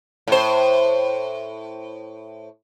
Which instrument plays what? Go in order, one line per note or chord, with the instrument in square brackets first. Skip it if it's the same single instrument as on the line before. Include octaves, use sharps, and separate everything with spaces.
[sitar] A2 C5